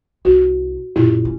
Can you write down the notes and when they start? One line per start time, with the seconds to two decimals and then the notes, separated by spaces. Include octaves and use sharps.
0.25 C2 F#4
0.96 F#2 A#2 E4 F4 G4
1.25 C#4